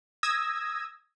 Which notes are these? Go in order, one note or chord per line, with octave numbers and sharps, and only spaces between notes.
D#6 E6 G#6 A#6